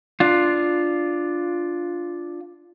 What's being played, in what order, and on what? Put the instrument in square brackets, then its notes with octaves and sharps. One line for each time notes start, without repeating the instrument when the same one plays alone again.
[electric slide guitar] D4 F4